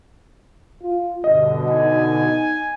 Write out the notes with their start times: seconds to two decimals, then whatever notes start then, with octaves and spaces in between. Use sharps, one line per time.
0.82 F4
1.24 G2 B2 D3 D#5
1.71 D#4 G#5